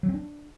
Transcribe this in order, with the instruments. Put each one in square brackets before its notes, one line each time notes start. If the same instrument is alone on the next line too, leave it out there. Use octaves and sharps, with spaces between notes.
[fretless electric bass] F#3
C4
D4